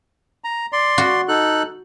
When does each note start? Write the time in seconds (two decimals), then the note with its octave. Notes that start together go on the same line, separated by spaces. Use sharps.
0.44 A#5
0.73 D5 C6
0.98 F#4
1.28 D#4 A4 F#6